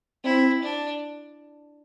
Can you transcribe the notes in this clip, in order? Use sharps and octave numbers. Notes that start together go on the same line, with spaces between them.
C4 E4
D4